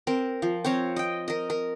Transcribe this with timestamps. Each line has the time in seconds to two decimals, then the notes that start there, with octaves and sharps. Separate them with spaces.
0.07 C4 A#4
0.42 F3
0.64 C4 C#5 F5 A#5
0.96 D#5 G5
1.28 A#4 D#5
1.50 A#4